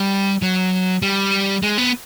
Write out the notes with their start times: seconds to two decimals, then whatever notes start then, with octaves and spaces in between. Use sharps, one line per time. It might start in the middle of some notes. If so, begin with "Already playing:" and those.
Already playing: G3
0.42 F#3
1.02 G3
1.63 G#3
1.78 B3